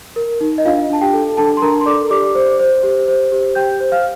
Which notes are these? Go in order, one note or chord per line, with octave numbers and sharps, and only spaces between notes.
A#4
D#4
D#5
D4 F4 F5
D4 A5
G4 G5
A4
D4 A4 A5
C6
D4 A#4 A#5
C6
A4 D5 D6
G4 D5 D6
C5
C5
G4
C5
G4
G4 G5 G6
C5
F5 F6